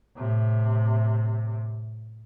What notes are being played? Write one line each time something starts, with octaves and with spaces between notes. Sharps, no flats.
A2 C3